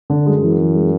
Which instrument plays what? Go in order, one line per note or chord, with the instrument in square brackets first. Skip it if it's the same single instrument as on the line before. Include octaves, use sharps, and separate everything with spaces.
[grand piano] D3
[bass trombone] F#2 [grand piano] G#3
[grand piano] E3
E3
G#3